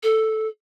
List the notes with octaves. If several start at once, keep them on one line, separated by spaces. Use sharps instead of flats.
A4